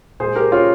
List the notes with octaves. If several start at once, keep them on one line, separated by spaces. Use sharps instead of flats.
A#2 G#3 G#4 C5
G4 A#4
C#4 F4